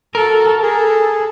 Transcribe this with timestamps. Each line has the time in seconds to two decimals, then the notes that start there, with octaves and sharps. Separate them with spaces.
0.15 F#4 A4 A#4
0.62 G#4 A4